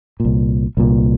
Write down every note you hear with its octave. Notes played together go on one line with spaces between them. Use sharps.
C2 A#2
C2 A#2